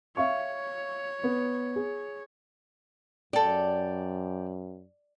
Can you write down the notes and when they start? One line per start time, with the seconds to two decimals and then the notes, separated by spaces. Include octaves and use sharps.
0.17 C#5 E5 F5 C#6
1.24 B3
1.76 G#4
3.33 F#2 G4 A4 D5